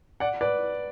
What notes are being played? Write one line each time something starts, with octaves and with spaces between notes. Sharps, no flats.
D5 F#5
B4 D5